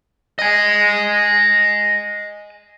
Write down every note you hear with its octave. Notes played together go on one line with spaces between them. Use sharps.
D#5 G#5